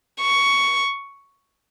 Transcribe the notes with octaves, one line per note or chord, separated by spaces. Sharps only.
C#6